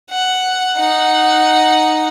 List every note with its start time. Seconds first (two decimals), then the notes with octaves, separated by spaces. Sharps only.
0.10 F#5
0.78 D#4 F#5